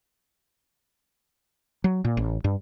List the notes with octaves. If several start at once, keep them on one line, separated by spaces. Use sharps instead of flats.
F#3
A#2
A1
G2